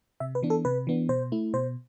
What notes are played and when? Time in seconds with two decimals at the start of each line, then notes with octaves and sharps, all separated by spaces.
0.20 C3 E5
0.35 B4
0.43 E3 B3 D4
0.50 A4
0.65 C3 B4
0.87 E3 B3 D4
1.09 B2 C5
1.32 A3 E4
1.54 B2 C5